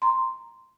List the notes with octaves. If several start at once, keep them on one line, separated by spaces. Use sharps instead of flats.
A#5 C6